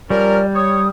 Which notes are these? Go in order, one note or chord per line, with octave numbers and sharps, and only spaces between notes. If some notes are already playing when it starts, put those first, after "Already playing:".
F3 G3 C#4 A#4 D5
C#5 D#6